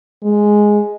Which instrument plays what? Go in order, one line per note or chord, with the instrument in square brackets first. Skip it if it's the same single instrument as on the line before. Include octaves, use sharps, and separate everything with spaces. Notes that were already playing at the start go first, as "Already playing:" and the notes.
[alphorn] G#3